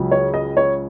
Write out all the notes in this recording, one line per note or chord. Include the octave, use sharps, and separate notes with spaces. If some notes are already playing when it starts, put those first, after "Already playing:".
Already playing: C#2 C#3 F#3
C#5
D#5
C#5